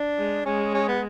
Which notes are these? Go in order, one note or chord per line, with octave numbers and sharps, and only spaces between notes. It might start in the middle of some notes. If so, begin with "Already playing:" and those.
Already playing: D4
G#3
G#3 C#4
C#4
B3